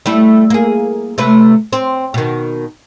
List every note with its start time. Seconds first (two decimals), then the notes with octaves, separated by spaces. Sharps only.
0.06 G3 A3 E4
0.50 A#3 G#4
1.18 C3 A3 B4
1.73 C4
2.14 B2 D#3